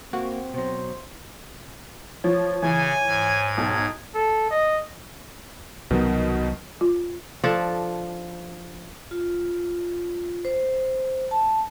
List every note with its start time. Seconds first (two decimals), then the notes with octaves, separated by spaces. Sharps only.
0.13 A#3 C4 F#4
0.54 B2 F#3 C5
2.24 F3 C#5
2.62 C#3 E3 G#5
3.06 G#2 G#6
3.57 B1 D#4 D#6
4.14 A4
4.51 D#5
5.91 C2 B2 D#3 F#3 B3
6.81 F4
7.44 F3 D4 A4
9.11 F4
10.45 C5
11.31 A5